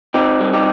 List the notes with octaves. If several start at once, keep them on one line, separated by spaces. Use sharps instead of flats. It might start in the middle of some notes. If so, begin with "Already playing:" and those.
C4 D#4 G4
G3
D#4 G4